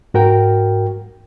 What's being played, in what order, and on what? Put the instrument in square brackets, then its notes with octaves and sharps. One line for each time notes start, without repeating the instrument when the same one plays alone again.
[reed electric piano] G#2 F#4 A#4 G5